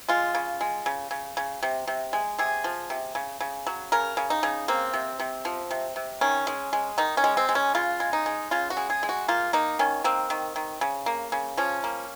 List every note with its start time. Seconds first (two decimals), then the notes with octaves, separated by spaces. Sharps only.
0.09 G#3 F4
0.35 C#3
0.61 G#3
0.86 C#3
1.11 C#3
1.37 C#3
1.63 C3
1.88 C3
2.13 G#3
2.38 C3 G#4
2.64 F3
2.90 C3
3.15 C#3
3.41 C#3
3.67 F#3
3.92 C#3 A#4
4.17 C#3
4.30 D#4
4.43 C#3
4.68 A#3 C4
4.94 C3
5.19 C3
5.45 F3
5.71 C3
5.96 C3
6.21 D#3 C#4
6.47 G#3
6.73 G#3
6.98 D#3 D#4
7.17 C#4
7.24 G#3
7.37 C4
7.49 G#3
7.55 C#4
7.75 C#3 F4
8.00 G#3
8.13 D#4
8.26 G#3
8.51 C#3 F4
8.70 F#4
8.77 G#3
8.90 G#4
9.03 G#3
9.09 F#4
9.28 A#3 F4
9.53 A#3 D#4
9.79 D#3 C#4
10.04 A#3 C4
10.30 D#3
10.56 D#3
10.81 C#3
11.06 A#3
11.32 C#3
11.57 F3 C#4
11.84 A#3